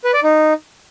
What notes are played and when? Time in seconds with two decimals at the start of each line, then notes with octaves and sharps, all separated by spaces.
0.04 B4
0.14 D5
0.23 D#4